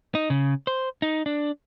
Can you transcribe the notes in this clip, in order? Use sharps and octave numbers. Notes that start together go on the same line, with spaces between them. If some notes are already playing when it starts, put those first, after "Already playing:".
D#4
C#3
C5
D#4
D4